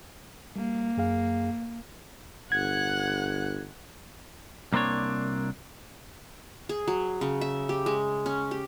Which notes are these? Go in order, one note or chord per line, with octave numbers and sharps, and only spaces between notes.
G3 A#3
F#2 G#4 F5
G1 F#5 F#6 G#6
C2 A#3 C4 D4 C#5
G#4
F#3
C#3
E5
G4
G#3
C#4
G4